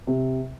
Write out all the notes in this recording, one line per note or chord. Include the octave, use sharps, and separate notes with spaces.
C3